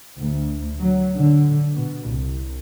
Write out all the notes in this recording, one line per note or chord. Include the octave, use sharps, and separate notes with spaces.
D2
F#3
D3
B2
C2